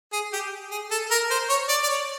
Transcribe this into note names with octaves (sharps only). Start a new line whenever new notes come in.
G#4
G4
G#4
A4
A#4
C5
C#5
D5
D5
C#5